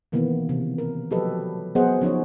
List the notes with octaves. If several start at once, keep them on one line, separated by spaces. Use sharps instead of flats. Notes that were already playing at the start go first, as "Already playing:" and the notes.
B2 D#3 E3 A#3 B3
C3
A#4
F3 F#3 G4 A4 B4 D#5
F#3 B3 G#4 C5 D#5 F#5
F3 C#4 D#4 C#5